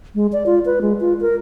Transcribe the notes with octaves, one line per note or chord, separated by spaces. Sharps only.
G#3
D5
F4
B4
G#3
F4
A#4